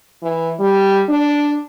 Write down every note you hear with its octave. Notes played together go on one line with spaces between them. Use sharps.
E3
G3
D4